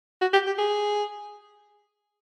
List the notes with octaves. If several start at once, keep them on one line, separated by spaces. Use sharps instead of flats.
F#4
G4
G4
G#4